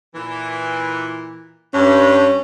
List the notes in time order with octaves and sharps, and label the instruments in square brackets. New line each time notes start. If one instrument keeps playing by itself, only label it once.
[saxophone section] A#2 E3
[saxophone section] G2 [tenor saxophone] C#4